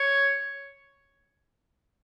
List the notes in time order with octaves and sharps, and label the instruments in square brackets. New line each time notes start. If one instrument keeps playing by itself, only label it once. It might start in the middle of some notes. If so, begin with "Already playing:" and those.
Already playing: [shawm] C#5